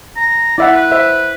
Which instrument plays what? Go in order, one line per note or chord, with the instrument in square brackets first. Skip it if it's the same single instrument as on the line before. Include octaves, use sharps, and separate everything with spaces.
[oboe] A#5
[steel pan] E4 E5 F#5 [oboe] D5
[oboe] B4
[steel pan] C5 E5